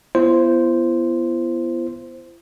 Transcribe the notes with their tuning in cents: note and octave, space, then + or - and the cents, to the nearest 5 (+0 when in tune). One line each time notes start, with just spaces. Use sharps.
B3 +0 E4 +45 C5 -5